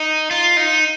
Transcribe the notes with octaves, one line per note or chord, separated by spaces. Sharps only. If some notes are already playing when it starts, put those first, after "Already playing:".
Already playing: D#4
F4
D#4